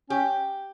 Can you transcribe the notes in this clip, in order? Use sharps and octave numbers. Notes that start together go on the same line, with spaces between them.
C#4 G4